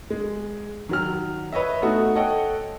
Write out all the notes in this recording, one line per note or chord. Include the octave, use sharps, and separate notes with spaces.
G#3
D#3 F#3 F6
B4 C#5 D#5 E5
A3 B3 D#4 F#4 A4
A4 C#5 D#5 F#5 G5